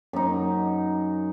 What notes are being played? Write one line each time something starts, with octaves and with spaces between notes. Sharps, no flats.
F#2 D#4